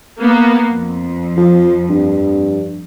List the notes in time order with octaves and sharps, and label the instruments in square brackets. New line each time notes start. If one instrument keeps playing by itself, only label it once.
[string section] A#3 B3
F2
[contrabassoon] F3
G2